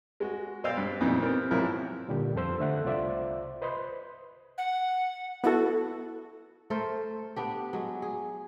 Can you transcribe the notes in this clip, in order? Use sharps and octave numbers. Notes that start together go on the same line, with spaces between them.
G#3 F#4
B1 C5 D5 D#5 F5 E6
G2
F2 A#2 E3 B3 C4 D#4
B3 C4 A#4
C2 G#2 F3 F#3 E4 A#4
A#2 D3 G3 G4
F2 F3 A4 C5 E6
D3 A3 E5 F#5
C2 F4 C5 D5 E5
B4 C5 D#5 B5 C6
F#5
B3 E4 F#4 A4
A3 A4 A#4 C5
B3 D4 G4
F#3 G#3
G#4